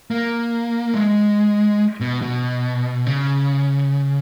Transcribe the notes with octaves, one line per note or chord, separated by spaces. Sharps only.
A#3
G#3
B2
B2
C#3